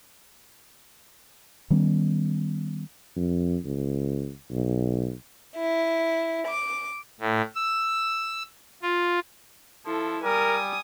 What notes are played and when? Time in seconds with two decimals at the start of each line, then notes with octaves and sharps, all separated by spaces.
1.70 D#3 G3 B3 C#4
3.16 F2
3.65 C#2
4.51 B1
5.56 E4
6.47 D6
7.20 A2
7.55 E6
8.83 F4
9.86 F3 E4 A4
10.23 G3 A#4 G#5 D#6